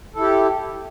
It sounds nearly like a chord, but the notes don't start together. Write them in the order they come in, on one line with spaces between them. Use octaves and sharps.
A4 E4 G4